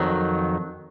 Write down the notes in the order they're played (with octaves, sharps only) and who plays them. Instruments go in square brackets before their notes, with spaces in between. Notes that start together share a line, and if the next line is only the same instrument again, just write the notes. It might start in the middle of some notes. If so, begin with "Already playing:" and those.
Already playing: [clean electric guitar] F2 D#3 F#3